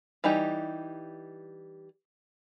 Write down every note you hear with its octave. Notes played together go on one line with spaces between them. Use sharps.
E3 G3 D#4 G4